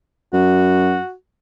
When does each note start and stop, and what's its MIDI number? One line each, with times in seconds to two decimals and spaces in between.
0.33 0.98 42
0.33 1.13 66